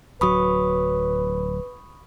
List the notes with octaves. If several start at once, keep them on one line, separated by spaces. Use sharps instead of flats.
D1 F#3 B4 B5 C#6 D#6